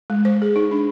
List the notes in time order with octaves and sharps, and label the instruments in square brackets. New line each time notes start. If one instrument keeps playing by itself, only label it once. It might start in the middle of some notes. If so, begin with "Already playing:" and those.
[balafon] G#3
C5
G#4
D#4
D4